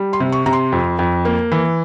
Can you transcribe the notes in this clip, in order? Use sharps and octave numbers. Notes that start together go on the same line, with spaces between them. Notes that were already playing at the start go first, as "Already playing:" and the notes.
Already playing: G3
C6
C3
C#6
C3 A#5
C6
F2
F2
A#3
E3